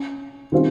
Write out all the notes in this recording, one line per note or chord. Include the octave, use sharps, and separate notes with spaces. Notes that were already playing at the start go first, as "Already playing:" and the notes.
Already playing: C#4
D#3 G3 C4 C#4 F4